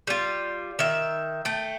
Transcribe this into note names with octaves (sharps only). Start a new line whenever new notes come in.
G3 F4
D#3 E5
A3 G5